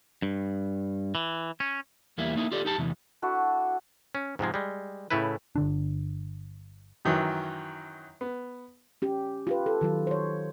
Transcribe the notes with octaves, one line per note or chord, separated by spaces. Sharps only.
G2
E3
C#4
E2 G3 A#3 E4
A#3 D#4 E4
F4 G4 A4 D5
D#4 G4 A5
E2 C3 E3
A3 D4 E4 F#4
C#4
G#2 C3 F3 G#3
G3 G#3
A2 C#3 A3 E4 B4
G1 D3 D4
F#2 D#3 E3 F#3
B3
C#4 G4
F4 G4 B4
A4
D#3 F#3 F4
C5 C#5